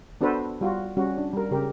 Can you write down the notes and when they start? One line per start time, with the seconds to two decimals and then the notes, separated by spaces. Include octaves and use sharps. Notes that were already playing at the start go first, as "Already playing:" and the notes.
0.21 B3 D4 F#4 A4 B4 C5
0.61 G3 F4 F#4
0.97 G3 C#4 F#4
1.18 D4
1.33 G3 A#4
1.51 C#3 G4 A#4